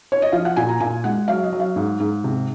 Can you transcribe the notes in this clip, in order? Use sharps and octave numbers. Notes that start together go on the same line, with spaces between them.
C#5
D#5
F3 F5
F#5
A#2 G#5
A#5
A#2 G#5
G#3 F#5
F#3 F5
D#5
F#3
F5
G#2
G#2
C3